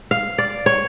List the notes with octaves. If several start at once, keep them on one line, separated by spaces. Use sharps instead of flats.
F5
D5
C#5